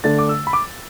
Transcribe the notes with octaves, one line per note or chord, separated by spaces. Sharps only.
D3 A3 D4 A6
D6
E6
B5
D6